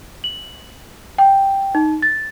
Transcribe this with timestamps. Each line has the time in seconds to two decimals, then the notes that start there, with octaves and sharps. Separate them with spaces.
0.24 F#7
1.18 G5
1.75 D#4
2.02 A6